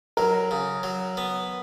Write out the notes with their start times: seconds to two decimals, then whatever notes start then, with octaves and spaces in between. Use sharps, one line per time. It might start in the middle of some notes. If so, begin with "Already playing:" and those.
0.17 F#3 A#4
0.51 C#3
0.83 F#3
1.17 B3